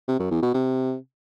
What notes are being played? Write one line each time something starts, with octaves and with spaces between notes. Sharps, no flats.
C3
F#2
E2
B2
C3